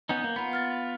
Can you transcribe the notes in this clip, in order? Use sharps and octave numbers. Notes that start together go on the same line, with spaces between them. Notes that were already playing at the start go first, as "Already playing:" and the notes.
B3 C#4 D#4 G6
A#3
B3 F4 A#5 B5
F6 A6